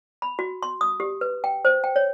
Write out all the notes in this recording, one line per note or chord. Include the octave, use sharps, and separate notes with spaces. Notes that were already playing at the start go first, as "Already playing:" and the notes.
B5
F#4
C6
D#6
G4
B4
G5
C5
G5
C#5